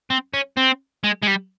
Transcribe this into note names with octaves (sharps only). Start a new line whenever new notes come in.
C4
C#4
C4
G#3
G#3
G3